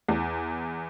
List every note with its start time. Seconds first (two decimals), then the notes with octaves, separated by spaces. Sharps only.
0.09 E2